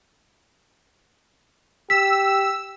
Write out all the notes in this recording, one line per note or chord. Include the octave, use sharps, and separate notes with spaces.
G4 E6 B6